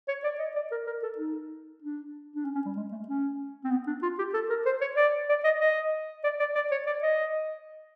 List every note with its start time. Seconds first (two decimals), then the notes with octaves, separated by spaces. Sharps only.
0.08 C#5
0.24 D5
0.39 D#5
0.55 D5
0.71 A#4
0.87 A#4
1.03 A4
1.18 D#4
1.82 D4
2.35 D4
2.45 C#4
2.55 C#4
2.66 G3
2.77 G#3
2.92 A3
3.08 C#4
3.64 C4
3.71 B3
3.87 D4
4.03 F4
4.18 G4
4.34 A4
4.50 A#4
4.66 C5
4.81 C#5
4.97 D5
5.29 D5
5.44 D#5
5.61 D#5
6.24 D5
6.40 D5
6.55 D5
6.71 C#5
6.87 D5
7.03 D#5